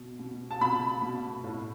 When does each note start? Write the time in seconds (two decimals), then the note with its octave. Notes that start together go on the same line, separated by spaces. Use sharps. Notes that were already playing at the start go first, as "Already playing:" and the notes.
Already playing: B2
0.19 B2
0.51 A5
0.61 B2 B5
1.02 B2
1.44 A2